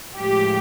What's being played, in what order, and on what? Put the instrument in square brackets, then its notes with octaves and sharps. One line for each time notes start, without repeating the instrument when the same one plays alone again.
[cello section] A2 F3 G#3 G4